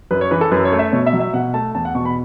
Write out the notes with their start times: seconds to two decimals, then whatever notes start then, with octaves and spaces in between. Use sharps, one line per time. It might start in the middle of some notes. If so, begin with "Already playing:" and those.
0.11 F#2 B4
0.21 C#5
0.31 E3 B4
0.41 A4
0.52 F#2 B4
0.65 C#5
0.72 A3
0.79 E5
0.92 B2 C#5
1.06 E5
1.13 F#3
1.20 E5
1.34 B2 F#5
1.54 A3 A5
1.75 E2 A5
1.85 F#5
1.95 B2 C#6
2.05 B5